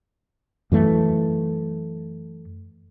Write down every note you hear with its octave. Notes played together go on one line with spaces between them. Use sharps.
F#2 E3 A3